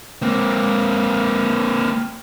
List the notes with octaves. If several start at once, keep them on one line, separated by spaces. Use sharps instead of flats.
A#3 C4